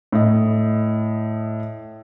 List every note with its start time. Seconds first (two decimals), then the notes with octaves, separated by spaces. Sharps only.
0.12 A2 D#5